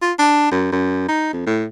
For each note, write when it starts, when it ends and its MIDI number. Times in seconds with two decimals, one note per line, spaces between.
0.02 0.12 65
0.19 0.51 62
0.51 0.69 42
0.72 1.03 42
1.08 1.30 63
1.33 1.43 41
1.46 1.65 45